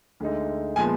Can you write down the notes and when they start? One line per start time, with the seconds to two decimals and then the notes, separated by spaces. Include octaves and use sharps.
0.20 D2 D3 G#3 D#4
0.76 A#2 F3 G#3 B3 G#5